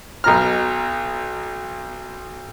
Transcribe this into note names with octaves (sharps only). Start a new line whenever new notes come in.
B1 B2 A#5 F6